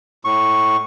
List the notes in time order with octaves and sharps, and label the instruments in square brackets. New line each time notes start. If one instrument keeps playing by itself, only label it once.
[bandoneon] A2 C#6